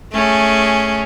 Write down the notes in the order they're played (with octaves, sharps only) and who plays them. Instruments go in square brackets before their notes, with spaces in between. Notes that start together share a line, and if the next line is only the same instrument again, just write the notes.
[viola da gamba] A3 C#4 G#4